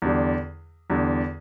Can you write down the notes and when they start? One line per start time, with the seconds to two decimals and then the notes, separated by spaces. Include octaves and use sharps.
0.02 E2 D3 G3
0.90 E2 D3 G3